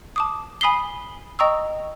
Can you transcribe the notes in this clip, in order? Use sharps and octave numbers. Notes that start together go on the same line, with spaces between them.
A5 D6 D#6
G#5 B5 D#6 B6 C7 G7
D#5 G5 A#5 C#6 D#6 E6